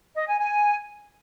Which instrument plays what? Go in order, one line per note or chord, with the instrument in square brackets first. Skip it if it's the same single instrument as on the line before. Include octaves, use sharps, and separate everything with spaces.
[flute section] D#5
G#5
G#5